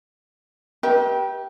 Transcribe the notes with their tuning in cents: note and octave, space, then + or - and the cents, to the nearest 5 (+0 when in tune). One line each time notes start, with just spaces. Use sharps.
G4 -10 B4 -45 E5 -40